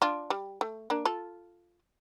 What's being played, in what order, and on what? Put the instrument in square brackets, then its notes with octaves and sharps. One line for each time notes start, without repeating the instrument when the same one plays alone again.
[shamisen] D4 F4
G3
A3
A#3 D4
F4 A4